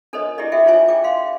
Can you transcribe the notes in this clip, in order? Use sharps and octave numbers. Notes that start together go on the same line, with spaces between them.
D4 A4 A#4 C5 C#5 D#5
D4 E4 G4 G#4 D5 D#5
F#4 G#4 A4 E5 G5
D4 F4 C5 C#5 E5 G#5
G5 D6
F5 C6